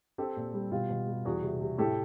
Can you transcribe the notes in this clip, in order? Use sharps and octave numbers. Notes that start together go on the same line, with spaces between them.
C4 G4 A4
A#2
G3
B2 F4 G4
B2
G3
E2 F#4 G#4
C3
C3
A2 G4 A4